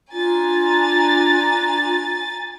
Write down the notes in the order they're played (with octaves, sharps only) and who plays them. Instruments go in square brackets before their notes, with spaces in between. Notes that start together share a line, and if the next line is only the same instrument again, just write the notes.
[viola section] D4 A#5 [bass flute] F4 [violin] G#5 A6